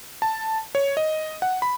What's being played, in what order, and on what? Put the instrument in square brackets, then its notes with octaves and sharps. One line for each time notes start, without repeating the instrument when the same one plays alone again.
[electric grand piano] A5
C#5
D#5
F#5
B5